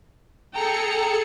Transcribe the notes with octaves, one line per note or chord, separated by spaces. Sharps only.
G#4 A4 G5 A#5 C#7